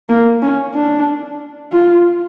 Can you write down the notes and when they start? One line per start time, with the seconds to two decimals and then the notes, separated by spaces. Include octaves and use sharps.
0.09 A#3
0.42 C#4
0.75 D4
1.72 F4